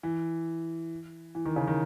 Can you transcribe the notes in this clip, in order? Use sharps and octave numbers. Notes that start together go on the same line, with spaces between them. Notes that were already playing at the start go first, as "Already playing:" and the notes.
E3
E3
D#3
C#3
D#3